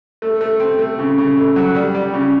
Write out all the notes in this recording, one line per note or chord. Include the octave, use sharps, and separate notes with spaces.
A3
A3
C4
A3
C#3
C#3
A3
F#3
G3
G3
C#3